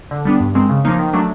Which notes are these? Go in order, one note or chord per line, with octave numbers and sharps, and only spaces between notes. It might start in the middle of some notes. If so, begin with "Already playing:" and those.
D3
G3 B3 D4
G2
D#3 G#3 C4
C#3
F3 A#3 D#4
D#3
F#3 A3 D4